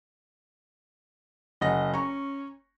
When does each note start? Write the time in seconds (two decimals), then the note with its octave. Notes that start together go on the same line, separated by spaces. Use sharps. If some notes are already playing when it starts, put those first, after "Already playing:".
1.61 F#1 D#5 F#5 A#6
1.94 C#4 A#5 C#6